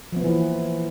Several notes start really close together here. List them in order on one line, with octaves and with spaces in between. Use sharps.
F3 B3 A#3 E3